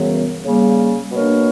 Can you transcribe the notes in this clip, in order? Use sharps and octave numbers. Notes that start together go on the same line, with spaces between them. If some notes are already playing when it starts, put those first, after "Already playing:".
Already playing: F#2 C#3 E3 G3 B3
C#3 G3 A#3
B2 A#3 D4 A#4 C#5